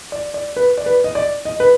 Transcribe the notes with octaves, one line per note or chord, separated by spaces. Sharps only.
D5
D5
B4
D5
B4
D#5
D5
D#5
B4